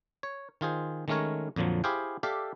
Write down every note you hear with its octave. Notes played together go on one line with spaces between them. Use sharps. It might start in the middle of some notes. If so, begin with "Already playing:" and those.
C#5
D#3 F4 G#4 C5
D#3 G#3 A3 C#4 A#4 C#5
F2 A#2 D3 F3 F#3
E4 G4 G#4 C5 F5 G5
G4 A4 D5 E5 F5